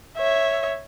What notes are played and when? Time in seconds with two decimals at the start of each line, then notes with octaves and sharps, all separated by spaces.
0.18 C#5 E5